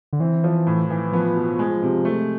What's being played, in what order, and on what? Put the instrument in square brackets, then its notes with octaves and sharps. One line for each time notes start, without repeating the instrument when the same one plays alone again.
[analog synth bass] D3
[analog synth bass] E3 [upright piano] C4
[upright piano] F3
A2
E3
[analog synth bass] F3 [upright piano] B3
[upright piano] B2
G#3
C3
A3